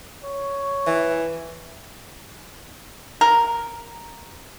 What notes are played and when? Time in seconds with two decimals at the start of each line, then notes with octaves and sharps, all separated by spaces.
0.25 C#5
0.86 E3
3.21 A#4